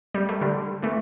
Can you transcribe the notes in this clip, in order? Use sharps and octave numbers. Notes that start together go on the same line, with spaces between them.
G3
A3
D3 G3
E3 A3